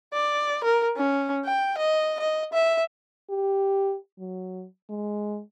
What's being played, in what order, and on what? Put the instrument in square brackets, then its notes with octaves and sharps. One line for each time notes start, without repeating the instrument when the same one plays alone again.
[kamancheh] D5
A#4
C#4
G5
D#5
D#5
E5
[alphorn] G4
F#3
G#3